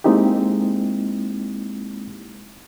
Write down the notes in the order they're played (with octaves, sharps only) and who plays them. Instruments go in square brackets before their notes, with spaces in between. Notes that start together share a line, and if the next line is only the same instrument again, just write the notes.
[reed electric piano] G#3 A#3 C4 D#4 E4 G4